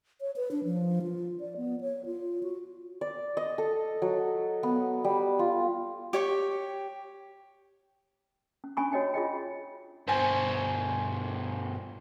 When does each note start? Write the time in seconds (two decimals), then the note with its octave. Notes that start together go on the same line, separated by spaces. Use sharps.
0.21 C#5
0.36 B4
0.51 D4
0.65 F3
1.02 F4
1.40 D5
1.57 B3
1.81 C#5
2.06 F4
2.43 F#4
3.01 D5
3.37 D#5
3.58 A4
4.02 F#3
4.63 B3
5.04 G3
5.39 F4
6.13 G4 C#5 C#6
8.64 C#4
8.77 C#4 D4 G#5 B5 C#6
8.92 F#4 C#5 D#5 G5 G#5
9.14 F4 G#4 D#5 G5
10.08 G2 B2 C5 G#5